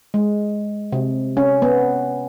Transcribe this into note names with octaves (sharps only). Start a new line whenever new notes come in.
G#3
C3
C#4
B3